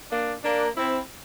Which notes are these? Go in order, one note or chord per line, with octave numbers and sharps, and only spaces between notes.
A#3 D4
A#3 D4
C4 E4